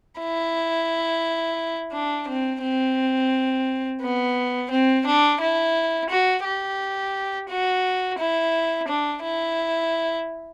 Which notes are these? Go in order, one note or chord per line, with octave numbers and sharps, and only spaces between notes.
E4
D4
C4
C4
B3
C4
D4
E4
F#4
G4
F#4
E4
D4
E4